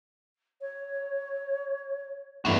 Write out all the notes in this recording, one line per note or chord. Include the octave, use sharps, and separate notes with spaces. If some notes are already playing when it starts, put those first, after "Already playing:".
C#5
E2 G2 A3 E4 F#4